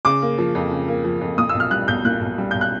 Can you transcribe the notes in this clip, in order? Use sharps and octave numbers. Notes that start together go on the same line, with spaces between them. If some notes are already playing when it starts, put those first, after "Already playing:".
C#3 D6
A#3
F3
F2
C#3
A#3
F3
F2
A#2 D#6
E6
B1
F6
G3 F#6
B1 G6
A#2 F#6
B1
G3
B1 G6
F#6